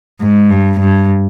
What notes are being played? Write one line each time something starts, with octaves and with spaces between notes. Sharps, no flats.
G#2
G2
G2